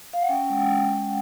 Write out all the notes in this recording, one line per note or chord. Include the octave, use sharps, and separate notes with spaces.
F5
F#5
C#4 G5
G#3